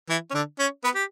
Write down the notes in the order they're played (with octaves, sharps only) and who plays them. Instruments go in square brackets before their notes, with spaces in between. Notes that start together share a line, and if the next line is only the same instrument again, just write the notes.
[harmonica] E3 E4
C#4
D3 D4
C#4 C#5
B3 B4
G4